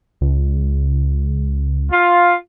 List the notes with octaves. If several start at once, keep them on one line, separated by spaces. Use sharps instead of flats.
C#2
F4